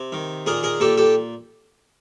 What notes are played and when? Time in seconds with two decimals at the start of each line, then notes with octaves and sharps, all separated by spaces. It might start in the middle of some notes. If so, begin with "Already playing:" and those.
Already playing: C3
0.12 D#3
0.46 A#2 G#4 A#4
0.63 G#4 A#4
0.80 A#2 G4 A4
0.97 G4 A4